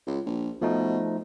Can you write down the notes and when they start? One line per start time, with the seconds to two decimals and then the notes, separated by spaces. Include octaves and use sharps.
0.07 C#2
0.26 A#1
0.62 B2 F3 A3 D#4